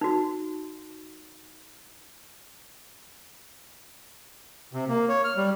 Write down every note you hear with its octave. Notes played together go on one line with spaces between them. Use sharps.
D#4 F#4
C3
A#3
C#5
F6
G3